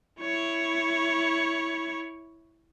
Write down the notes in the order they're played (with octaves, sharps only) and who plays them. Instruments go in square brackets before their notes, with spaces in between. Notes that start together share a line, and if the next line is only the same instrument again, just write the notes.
[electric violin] E4 C#5